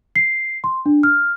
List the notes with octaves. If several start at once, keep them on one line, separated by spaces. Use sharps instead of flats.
C7
C6
D4
F6